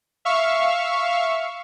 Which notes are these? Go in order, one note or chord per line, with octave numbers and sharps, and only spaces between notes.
E5 F5 C#6